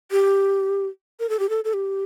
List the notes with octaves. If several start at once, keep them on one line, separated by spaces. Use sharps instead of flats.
G4
A#4
A4
G4
A4
A4
G4